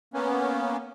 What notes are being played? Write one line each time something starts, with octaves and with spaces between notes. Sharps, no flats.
A#3 B3 C#4